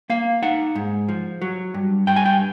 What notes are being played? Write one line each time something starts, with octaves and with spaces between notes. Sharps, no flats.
A#3 F5
D#4 F#5
G#2
F3
F#3
G2
G2 G5
G#5
G5